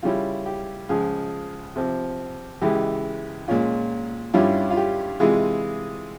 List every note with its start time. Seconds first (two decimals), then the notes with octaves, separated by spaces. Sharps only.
0.03 C#3 G3 C#4 E4 F4
0.46 G4
0.89 C#2 C#3 F3 G#3 F4 G#4
1.76 C3 F3 C4
2.61 C#2 C#3 E3 G#3 E4 G4
3.48 A#2 G#3 C#4 F4
4.34 G2 G3 C#4 E4 F4
4.70 F4
4.77 G4
5.20 C3 E3 G#3 F4 G#4